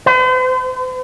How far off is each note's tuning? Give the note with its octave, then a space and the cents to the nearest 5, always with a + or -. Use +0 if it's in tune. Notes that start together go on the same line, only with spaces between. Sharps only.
C5 -45